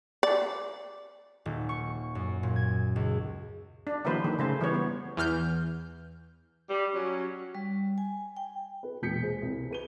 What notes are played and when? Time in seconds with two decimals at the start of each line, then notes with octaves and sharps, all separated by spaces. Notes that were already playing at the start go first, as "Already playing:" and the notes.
0.23 D5
1.46 D#1
1.69 C#6
2.15 F#2
2.43 A#2
2.56 G#6
2.96 C#2
3.87 D4
4.05 D3 E3 F#3 A#3 B4 C5
4.24 D#3
4.39 C#3 A3 C5
4.61 E3 G3 B3 C#5
4.74 B3
5.17 E2 E3 F6 G6
6.70 G3
6.93 F#3 C#4
7.55 G3
7.98 G#5
8.37 G5
8.83 B4
9.02 E1 A#2 G#3 G6 B6 C#7
9.21 G#4 C5
9.42 C2
9.71 B4 D#7 G7